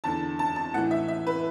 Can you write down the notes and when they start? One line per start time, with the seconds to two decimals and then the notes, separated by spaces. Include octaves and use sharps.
0.04 E2 D3 A5
0.39 A5
0.56 A5
0.74 A2 F#5
0.78 E3
0.91 E5
1.08 E5
1.27 B4